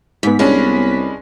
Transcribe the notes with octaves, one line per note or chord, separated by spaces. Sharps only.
G#2 B3 B6
C2 G#3 C#4 D4 B4